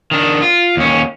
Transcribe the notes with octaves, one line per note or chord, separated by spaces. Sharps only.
D#3 D4
F4
D#2 C#4